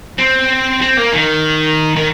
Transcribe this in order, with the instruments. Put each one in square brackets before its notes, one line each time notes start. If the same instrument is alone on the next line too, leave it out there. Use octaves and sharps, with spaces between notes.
[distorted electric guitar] C4
C4
A#3
D#3
D#3